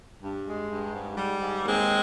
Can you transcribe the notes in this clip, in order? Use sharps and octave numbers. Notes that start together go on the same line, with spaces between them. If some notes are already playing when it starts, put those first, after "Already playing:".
G2
G#3
G2
G#2
G3
G#2
D#2 G#3 C4